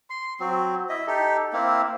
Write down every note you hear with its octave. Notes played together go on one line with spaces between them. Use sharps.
C6
F#3 C4
E4 D#5 E5
D#4 G4 A4
A#3 C4 E4